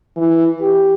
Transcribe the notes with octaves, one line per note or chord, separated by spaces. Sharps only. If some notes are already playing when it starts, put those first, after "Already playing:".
E3
G4